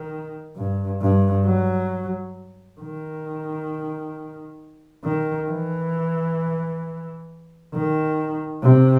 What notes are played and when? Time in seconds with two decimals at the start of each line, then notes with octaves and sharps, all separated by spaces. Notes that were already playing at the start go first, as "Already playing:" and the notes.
Already playing: D#3
0.56 G2
1.01 G2
1.45 F#3
2.80 D#3
5.04 D#3
5.49 E3
7.74 D#3
8.63 C3